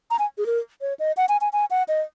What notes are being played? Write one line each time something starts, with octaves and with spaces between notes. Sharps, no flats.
A#5
G#5
G#4
A#4
C#5
D#5
F#5
G#5
G#5
G#5
F#5
D#5